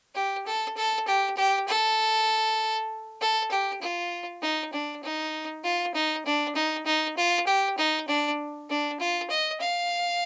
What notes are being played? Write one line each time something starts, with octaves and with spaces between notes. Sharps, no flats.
G4
A4
A4
G4
G4
A4
A4
G4
F4
D#4
D4
D#4
F4
D#4
D4
D#4
D#4
F4
G4
D#4
D4
D4
F4
D#5
F5